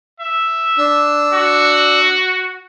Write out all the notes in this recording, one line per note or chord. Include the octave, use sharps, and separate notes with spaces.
E5
D4 E6
F#4